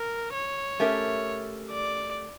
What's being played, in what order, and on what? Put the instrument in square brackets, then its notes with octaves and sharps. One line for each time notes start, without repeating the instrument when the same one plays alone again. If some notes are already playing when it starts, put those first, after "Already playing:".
Already playing: [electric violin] A#4
C#5
[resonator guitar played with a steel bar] A3 C#4 G4 A#4 E5
[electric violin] D5